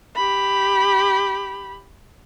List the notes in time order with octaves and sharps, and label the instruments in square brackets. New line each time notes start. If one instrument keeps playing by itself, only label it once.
[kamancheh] G4 B5